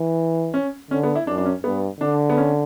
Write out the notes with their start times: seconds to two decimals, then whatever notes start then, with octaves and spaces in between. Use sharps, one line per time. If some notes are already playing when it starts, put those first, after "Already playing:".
Already playing: E3
0.54 C#4
0.91 D3 C#4
1.03 B3
1.15 E4
1.27 F#2 D4
1.38 D4
1.45 C#4
1.63 G2 B3
2.00 D3 D4
2.30 B3
2.37 C#4